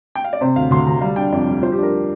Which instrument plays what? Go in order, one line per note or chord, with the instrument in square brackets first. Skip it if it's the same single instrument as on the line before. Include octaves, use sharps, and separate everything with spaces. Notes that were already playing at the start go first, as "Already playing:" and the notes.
[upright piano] G5
F5
D5
C3 C5
D2 F5
D2 C6
D2 A#5
G3 F5
D4 G5
F2 D5
G3
F3 C5
G4
D4 A#4